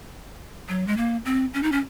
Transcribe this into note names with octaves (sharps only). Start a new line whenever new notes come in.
F#3
G#3
A#3
C4
C#4
D#4
C#4